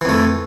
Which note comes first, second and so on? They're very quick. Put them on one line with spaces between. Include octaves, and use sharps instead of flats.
E3 F2 A3